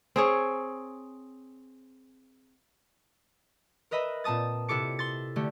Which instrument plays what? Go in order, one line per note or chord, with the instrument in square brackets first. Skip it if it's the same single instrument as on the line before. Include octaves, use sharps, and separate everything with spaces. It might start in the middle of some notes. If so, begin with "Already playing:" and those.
[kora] C4 G#4 C#5
[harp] A#4 B4 D#5 E5 B5
A#2 C4 A5 D#6 A6
C3 E4 A4 D6 C#7
C6 A6
D3 A3 G4